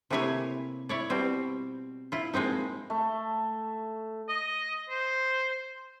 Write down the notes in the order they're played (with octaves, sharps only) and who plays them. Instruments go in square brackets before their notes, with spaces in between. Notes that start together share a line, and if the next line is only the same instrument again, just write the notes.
[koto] C3 A3 A#3 E4 C#5 G#5
E4 C#5 D5
B2 G3 C4
E4 F4
F3 G#3 A#3 C4 D#4
[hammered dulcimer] A3
[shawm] D#5
C5